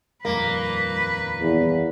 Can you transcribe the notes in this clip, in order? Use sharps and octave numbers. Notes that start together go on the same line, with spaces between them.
D#1 F2 G3 A#3 B4
E2